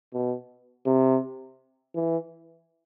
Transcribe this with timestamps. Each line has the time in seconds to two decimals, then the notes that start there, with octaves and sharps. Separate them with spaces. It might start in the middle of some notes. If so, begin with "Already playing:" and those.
0.13 B2
0.86 C3
1.95 E3